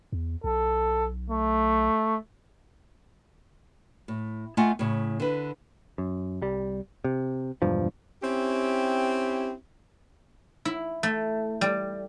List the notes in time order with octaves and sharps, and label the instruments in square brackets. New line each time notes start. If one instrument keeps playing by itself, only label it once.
[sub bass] E2
[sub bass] B1 [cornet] A4
[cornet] A3
[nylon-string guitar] A2
A3 F4 D#5 F#5 G#5
A2 C#3
D3 B4
[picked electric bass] F#2
C2 G3
C3
E1 G2 F3
[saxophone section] C4 C#4 E4 G4
[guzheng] E4
A3
G3